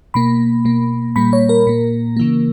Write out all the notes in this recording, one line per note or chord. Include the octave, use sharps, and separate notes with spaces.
B2 A#3 B5
B2 A#3
A#2 G3 A#3 B5
C#5
A#4
A#2 A#3
C#3 E3 A#3